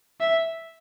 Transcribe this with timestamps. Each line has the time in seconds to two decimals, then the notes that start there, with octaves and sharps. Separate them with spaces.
0.20 E5